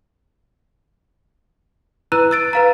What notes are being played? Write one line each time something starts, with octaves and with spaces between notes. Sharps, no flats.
E4 B4 A#5 E6 F#6 D#7
E6 A6 D7
B4 F5 A#5